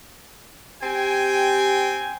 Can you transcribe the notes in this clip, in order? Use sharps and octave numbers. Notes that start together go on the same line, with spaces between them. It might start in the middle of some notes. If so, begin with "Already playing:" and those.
C4 G4 G5 G#5